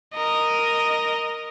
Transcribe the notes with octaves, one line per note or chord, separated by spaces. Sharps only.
A#4 D#5